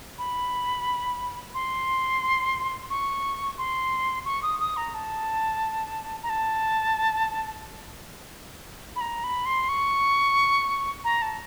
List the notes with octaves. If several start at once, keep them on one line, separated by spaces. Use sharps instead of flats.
B5
C6
C#6
C6
C#6
D#6
D#6
A#5
A5
A#5
A5
B5
A#5
B5
C6
C#6
A#5
A5